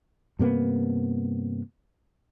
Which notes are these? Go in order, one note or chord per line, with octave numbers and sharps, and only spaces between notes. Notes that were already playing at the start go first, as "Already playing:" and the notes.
G2 C3 A#3 B3